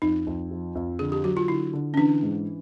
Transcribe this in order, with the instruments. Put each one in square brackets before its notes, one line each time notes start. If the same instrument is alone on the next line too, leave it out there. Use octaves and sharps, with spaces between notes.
[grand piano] F2 [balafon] D#4
[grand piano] F2
F3
F2
[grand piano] D3 [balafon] G#4
[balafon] G4
[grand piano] F#3 [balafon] F#4
[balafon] F4
[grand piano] D3 [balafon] E4
[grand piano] D3
[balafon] C#4
[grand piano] E3 [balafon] D4
[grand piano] G#2